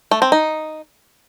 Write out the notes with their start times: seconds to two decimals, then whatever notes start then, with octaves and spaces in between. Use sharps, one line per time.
0.11 A3
0.22 C4
0.32 D#4